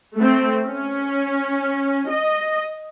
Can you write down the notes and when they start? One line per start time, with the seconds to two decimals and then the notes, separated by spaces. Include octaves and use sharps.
0.16 A3 C4
0.66 C#4
2.10 D#5